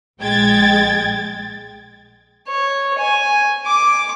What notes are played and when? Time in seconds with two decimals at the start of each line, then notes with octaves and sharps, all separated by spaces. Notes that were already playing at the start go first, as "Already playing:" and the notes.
0.20 A#1 G#3 G5 G#6 A6
2.48 C#5
2.99 G#5
3.66 D6